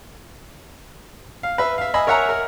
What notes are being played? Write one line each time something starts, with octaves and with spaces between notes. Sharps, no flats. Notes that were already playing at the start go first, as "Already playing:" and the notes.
F5
B4 E5
E5 F5
D#5 G#5 B5 E6
A#4 C#5 E5 F#5 G#5 A#5
A#4